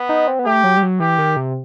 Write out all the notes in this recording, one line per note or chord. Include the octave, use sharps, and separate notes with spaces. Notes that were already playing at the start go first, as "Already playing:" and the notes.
Already playing: B3
D#4
C4
B3
A3 G4
F#3
G3
F#3
E3 G4
D#3
C3